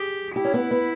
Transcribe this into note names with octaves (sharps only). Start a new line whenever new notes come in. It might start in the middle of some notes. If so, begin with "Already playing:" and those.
Already playing: G4 G#4
E4 G4
C#4
B3
B3